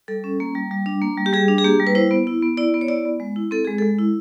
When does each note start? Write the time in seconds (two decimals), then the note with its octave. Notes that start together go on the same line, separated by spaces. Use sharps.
0.08 G3 A4
0.24 C#4
0.40 A#3
0.55 G3
0.71 G3
0.86 D4
1.02 A#3
1.18 G3
1.26 G4
1.33 G3 G#4
1.48 D4
1.58 G#4
1.65 A#3 G4
1.80 G3
1.87 B4
1.95 E4 C5
2.11 B3
2.27 E4
2.42 B3
2.57 E4 D5
2.74 B3
2.81 C#5
2.88 E4 D5
3.05 B3
3.20 G#3
3.36 E4
3.51 C4 A4
3.65 G#3 G#4
3.78 G#3 A4
3.99 E4